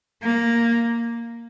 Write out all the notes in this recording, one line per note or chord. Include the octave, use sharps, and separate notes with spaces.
A#3